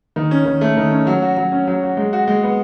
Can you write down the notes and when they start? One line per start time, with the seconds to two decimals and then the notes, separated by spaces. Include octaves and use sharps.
0.16 D#3
0.31 C#4
0.46 D#3
0.61 A3
0.77 D#3
0.91 C#4
1.07 F#3
1.22 F#4
1.37 F#3
1.52 C#4
1.67 F#3
1.83 F#4
1.97 G#3
2.13 F#4
2.28 G#3
2.43 B3